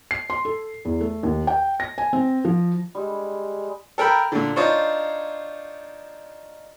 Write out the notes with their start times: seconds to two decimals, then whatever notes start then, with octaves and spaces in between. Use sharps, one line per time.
0.11 C7
0.30 C6
0.45 A4
0.85 E2
1.01 A3
1.23 D#2
1.47 G5
1.80 A#6
1.98 G#5
2.13 C4
2.45 F3
2.95 G3 G#3
3.98 A4 A#4 G5 B5
4.32 A#2 D3
4.56 D4 D#4 F4 C5 C#5